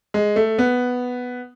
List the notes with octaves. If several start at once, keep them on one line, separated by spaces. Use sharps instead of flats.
G#3
A3
B3